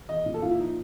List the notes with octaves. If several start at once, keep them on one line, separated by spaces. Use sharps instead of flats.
E2 D#5
A#2
A4
A#2 F4
E4
F3 D#4